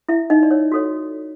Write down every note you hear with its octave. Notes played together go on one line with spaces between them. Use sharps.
E4 E5
D#4 D#5
D5
C#5
F#4 A4 C#5